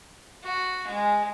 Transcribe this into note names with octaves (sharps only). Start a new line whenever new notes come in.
F#4
G#3